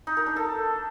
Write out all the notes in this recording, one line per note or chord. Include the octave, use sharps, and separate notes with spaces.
D#4
A#4
D4
A4